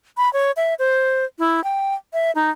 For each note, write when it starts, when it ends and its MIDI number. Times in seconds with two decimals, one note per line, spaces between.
0.17 0.31 83
0.33 0.52 73
0.57 0.74 76
0.79 1.25 72
1.39 1.63 64
1.64 1.94 79
2.13 2.31 76
2.35 2.50 63